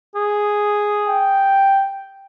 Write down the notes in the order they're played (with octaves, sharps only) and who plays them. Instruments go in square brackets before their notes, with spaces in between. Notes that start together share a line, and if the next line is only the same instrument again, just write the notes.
[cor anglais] G#4
[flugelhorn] G5